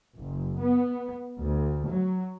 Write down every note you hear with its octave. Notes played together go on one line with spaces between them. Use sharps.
F#1
B3
D2
F#3